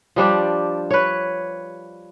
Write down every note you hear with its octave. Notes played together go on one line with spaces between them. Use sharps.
F3 G3 D4 G4
B4 C#5